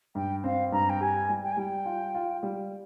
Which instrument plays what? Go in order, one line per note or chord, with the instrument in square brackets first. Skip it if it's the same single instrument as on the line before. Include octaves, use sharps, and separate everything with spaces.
[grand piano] G2 [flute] G5
[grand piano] C4 [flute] F5
[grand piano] G2 [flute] A#5
[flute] G5
[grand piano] G4 [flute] G#5
[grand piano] G3
[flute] G5
G#5
[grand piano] G3 [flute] G5
[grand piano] F4
F4
G3